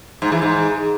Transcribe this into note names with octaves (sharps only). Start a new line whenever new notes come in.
G#2
E3
G#2